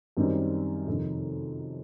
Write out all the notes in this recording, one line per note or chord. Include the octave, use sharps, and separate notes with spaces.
F#2 D#3 G3 C4
F2 C3 D#3